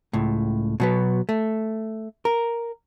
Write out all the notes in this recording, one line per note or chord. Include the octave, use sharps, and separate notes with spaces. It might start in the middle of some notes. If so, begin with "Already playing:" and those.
C#2 A2
B2 F#3 B3
A3
A#4